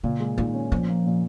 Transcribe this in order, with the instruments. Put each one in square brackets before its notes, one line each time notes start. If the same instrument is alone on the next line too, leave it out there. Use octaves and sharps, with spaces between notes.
[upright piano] A#2 [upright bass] C#3
[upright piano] G#3
[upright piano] A#2 [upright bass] D#3
[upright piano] C#4
[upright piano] A#2 [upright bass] F3
[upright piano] A#3
A#2